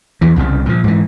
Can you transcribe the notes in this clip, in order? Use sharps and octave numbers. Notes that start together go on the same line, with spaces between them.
E2 E3
C2 F2 C#3 G3
A#2 F3
G#2 E3